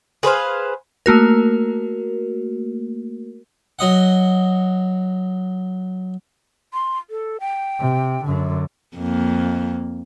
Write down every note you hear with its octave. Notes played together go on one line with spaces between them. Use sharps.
G#4 B4 C5 F5
A3 A#3 F#4 A#4
F#3 D#5 F#5
C6
A4
G5
C3
F#2 D3
F2 A#3